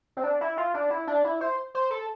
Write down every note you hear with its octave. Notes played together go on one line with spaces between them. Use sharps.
C4
D4
E4
F4
D4
E4
D4
E4
C5
C5
A4